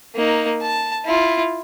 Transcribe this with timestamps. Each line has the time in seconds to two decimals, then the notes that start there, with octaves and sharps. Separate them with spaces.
0.15 A#3 D#4
0.61 A5
1.05 E4 F4